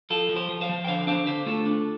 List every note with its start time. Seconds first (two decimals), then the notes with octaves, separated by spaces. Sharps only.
0.10 F3 F4 A4
0.29 F3
0.36 G4 C5
0.49 F3
0.61 C5 F5
0.69 F3
0.85 G5
0.87 D3 C5 F5
1.07 D4 C5 F5
1.26 D3 G4 C5
1.46 A3 F4 A4
1.66 D4